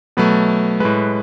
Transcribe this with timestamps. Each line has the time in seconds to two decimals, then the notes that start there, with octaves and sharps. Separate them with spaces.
0.17 B2 F#3 A3 B4
0.80 A2 G#3 B4